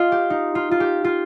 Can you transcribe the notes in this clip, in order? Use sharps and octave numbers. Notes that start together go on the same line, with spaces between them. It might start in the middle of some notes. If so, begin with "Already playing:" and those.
Already playing: F4 D#5
G4
D#4
F4
F4
G4
F4